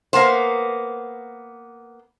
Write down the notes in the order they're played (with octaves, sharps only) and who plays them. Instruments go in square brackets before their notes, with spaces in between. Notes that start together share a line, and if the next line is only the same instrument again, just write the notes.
[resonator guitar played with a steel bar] A#3 B3 C5